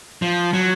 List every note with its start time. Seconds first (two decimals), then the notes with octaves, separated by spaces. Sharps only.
0.22 F3
0.53 F#3